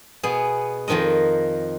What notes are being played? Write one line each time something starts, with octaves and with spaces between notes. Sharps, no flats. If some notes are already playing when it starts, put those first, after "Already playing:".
B2 B3 G#4
F2 D#3 F3 A#4 D#5